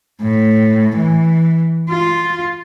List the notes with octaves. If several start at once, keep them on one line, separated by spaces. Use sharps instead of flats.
A2
E3
F4